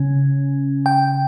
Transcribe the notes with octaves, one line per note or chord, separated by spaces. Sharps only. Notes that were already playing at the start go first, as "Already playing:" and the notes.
Already playing: C#3 C#4
G5